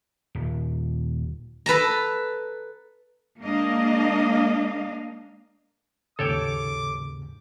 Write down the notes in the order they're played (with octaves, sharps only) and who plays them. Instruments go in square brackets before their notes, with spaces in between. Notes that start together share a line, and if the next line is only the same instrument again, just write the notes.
[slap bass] D#1
[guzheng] A4 B4 A5 A#5
[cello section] G#3 A#3 D4 D#5 F5
[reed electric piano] D#2 G#2 C#3 [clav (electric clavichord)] A4 C#5 G5 [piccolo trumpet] D6